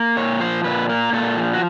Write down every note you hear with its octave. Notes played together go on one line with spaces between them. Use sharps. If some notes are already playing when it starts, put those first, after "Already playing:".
Already playing: A#3
A#2 C#5
F3 C5
A#2 B4
A#3 A#4
A#2 A4
F3
F#4